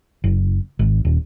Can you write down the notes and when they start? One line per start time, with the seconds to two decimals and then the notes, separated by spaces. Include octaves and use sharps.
0.24 F#1
0.79 G#1
1.05 D#1